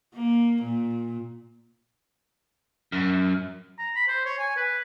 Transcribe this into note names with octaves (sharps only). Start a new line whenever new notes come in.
A#3
A#2
F#2
A#5
B5
C5
C#5
G#5
B4